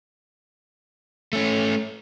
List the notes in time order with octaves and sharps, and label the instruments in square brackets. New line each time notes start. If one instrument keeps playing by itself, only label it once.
[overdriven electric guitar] A3 C#4